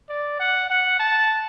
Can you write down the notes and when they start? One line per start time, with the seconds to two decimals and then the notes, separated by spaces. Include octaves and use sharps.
0.09 D5
0.40 F#5
0.70 F#5
0.99 A5